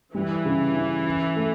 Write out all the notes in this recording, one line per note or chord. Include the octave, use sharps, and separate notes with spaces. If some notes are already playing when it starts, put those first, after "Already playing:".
E3 G3
C#3
C#4
E4
A3